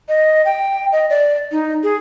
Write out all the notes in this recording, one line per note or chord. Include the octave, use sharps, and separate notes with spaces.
D#5
G5
D#5
D5
D#4
G#4